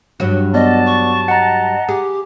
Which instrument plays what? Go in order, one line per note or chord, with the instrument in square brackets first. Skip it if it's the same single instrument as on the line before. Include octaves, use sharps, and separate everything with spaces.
[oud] G2 F#3 F#4
[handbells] B3 D5 [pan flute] D#5 [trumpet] A5
[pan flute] C#6
[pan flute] D#5 [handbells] F#5 A#5
[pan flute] G4 [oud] G#4